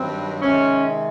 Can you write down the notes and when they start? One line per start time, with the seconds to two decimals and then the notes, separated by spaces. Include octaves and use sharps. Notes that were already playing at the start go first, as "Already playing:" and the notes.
Already playing: G2 D#3 F#3 C4
0.41 C3 D#3 G#3 C#4